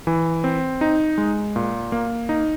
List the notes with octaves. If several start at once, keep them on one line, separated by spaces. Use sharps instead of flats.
E3
C4
D#4
G#3
A#2
A#3
D#4